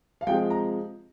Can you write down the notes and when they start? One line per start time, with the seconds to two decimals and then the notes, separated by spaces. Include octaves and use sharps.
0.21 F5
0.27 C3 F3 G#3 G5
0.50 A#5